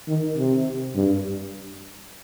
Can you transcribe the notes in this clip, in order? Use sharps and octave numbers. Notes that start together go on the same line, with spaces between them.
D#3
C3
G2